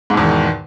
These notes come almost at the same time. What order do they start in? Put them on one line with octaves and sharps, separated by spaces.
G#2 B2 E2 D#3